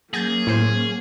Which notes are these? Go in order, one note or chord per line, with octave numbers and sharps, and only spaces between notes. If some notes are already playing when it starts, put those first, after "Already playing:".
F#3 A#3 C#4 G#4 G6 A6 A#6
A2 C5